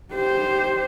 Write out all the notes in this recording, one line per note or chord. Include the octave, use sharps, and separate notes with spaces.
G4 C5